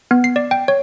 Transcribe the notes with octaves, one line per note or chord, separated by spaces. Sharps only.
B3
C7
D5
G5
C#5